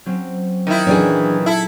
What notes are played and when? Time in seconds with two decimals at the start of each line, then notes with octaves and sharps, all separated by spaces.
0.06 F#3 C4 C#4
0.67 D#3 E4 D#7
0.87 A#2 E3 F#3 C#4 D4 G#4
1.46 E4 G#4 A4